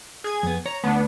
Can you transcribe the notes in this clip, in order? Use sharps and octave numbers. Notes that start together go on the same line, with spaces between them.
G#4 G#6
F2 B3
C#5 A#5
D2 A3 B3 D4